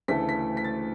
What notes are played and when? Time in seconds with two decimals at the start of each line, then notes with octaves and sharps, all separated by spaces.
0.08 D2 C#3 E3 A3 B6
0.29 B6
0.57 B6
0.64 A6